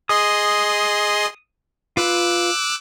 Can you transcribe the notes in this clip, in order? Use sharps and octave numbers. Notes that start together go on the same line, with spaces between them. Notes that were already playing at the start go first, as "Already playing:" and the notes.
G#4 D#5 C6 D#6
F4 B4 D6 E6 F#6